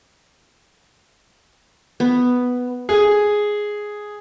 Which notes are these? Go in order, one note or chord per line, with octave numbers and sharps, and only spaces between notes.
B3
G#4